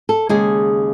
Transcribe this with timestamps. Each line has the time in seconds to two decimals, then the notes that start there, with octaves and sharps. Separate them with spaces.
0.09 A4
0.29 D#2 C#3 G#3 G#4